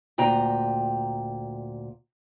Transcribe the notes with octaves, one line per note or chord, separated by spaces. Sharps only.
D2 A#2 G5 A#5